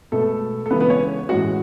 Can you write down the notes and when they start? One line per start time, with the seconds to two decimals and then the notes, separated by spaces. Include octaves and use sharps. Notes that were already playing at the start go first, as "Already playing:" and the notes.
0.12 B2 G#3 A3 B3 A4
0.66 A4
0.70 C#3 E3 G#3 B3 B4
0.80 B3 B4
0.90 C#4 C#5
1.29 A2 E3 G#3 C#4 F#4 F#5